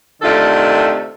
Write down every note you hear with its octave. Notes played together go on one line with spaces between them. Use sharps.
C3 D#3 A3 D4 F4 A4